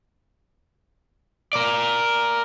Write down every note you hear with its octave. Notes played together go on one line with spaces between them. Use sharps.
A#4 D5